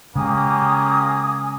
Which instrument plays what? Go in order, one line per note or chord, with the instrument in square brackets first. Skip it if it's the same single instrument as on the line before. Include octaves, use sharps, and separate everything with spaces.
[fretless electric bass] C#3 G#3 [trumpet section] A#3 C#4 G4 [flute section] G#5 D#6